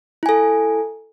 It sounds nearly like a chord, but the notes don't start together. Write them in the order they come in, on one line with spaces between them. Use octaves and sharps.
E4 G#5 A4